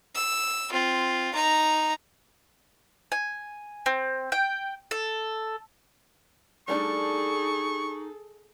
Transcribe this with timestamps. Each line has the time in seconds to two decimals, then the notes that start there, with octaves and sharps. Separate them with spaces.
0.15 E6
0.71 C4 F4
1.34 D#4 A#5
3.12 G#5
3.86 C4
4.32 G5
4.91 A4
6.68 G3 A3 D4 D#4 G#4 A4 C#6